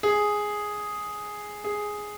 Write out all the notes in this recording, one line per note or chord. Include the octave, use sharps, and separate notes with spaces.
G#4
G#4